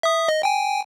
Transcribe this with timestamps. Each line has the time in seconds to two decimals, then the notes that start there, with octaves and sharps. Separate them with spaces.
0.03 E5 D#6
0.28 D#5
0.43 G5 G#5